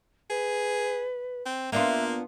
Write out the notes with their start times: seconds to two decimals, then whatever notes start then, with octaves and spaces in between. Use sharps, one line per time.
0.30 G#4 B4
1.46 C4
1.72 A#3 B3 D4 F4 E5